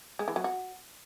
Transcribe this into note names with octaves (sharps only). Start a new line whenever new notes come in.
G#3
E3
F#3
F#4